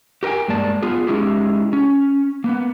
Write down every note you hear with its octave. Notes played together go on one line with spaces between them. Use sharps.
G4 A#4 B4 G5 G#5
G2 G#3 A#3 D5 A5
B3 F4 G#4
G#3 C#4 D#4 E4 G4 G#4
C#4
A#3 B3